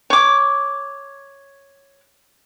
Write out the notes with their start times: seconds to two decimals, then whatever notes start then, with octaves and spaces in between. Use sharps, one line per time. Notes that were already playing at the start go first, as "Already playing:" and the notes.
0.10 C#5 D6